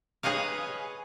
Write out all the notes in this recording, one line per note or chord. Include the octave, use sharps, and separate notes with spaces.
G#4 B4 C#5 D#5 F5